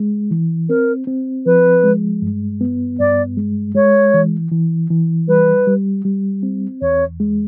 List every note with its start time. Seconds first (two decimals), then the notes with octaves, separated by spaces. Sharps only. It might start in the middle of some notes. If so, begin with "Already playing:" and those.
Already playing: G#3
0.31 E3
0.69 C4 A#4
1.07 C4
1.46 F3 B4
1.84 G#3
2.22 G2
2.61 B3
2.99 G2 D5
3.37 G#3
3.75 G#3 C#5
4.14 E3
4.51 E3
4.90 E3
5.28 G3 B4
5.67 G3
6.05 G3
6.43 C4
6.81 E2 C#5
7.20 G#3